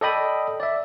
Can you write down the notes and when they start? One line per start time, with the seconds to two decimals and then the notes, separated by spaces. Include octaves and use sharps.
0.01 A4 D5 D#5 G5 B5 D#6
0.60 D5 E5